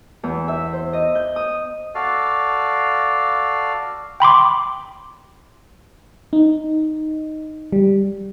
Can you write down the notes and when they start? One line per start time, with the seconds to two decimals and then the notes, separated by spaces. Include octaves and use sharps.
0.23 E2
0.48 E5
0.73 C5
0.93 D#5
1.15 G6
1.36 D#6
1.95 F#4 A4 D5 F5
4.20 G5 B5 C6 D6
6.33 D#4
7.72 G3